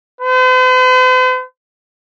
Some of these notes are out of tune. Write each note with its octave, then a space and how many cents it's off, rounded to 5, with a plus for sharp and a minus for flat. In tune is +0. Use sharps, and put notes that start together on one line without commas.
C5 -45